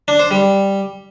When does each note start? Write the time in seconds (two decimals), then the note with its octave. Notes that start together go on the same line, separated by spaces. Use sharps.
0.08 D4
0.19 C5
0.31 G3